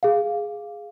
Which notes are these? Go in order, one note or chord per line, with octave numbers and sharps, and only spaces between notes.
G#4 F5